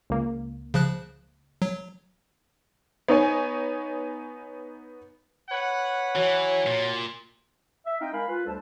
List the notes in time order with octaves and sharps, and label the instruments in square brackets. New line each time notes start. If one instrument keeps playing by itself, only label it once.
[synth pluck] C#2 A#3
[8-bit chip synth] C#3 F3 F#6
F#3
[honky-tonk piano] B3 D#4 C#5 G#5
[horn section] B4 C#5 F#5
[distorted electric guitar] E3 [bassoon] F#3
[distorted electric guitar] A#2
[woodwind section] E5
C4 D#4 D#5 F5 G5
G#3 A#4 F5 G#5 B5
F4 B4
D2 G3 D4 A4 C5 A5